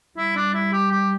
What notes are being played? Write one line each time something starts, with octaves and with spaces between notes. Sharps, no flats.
G3 E4
D4
E4
G4
G4